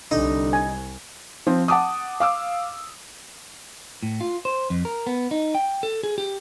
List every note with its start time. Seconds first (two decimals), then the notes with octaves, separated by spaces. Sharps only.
0.11 C2 D3 D#4
0.53 G#5
1.47 F3 C4
1.68 F#5 A5 D6 D#6
2.20 F5 D6 E6
4.03 A2
4.21 F4
4.45 C5
4.70 F2
4.85 A#4
5.07 B3
5.31 D#4
5.55 G5
5.83 A4
6.03 G#4
6.18 G4